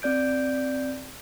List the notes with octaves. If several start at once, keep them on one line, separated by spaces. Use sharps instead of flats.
C4 D5 G6 D7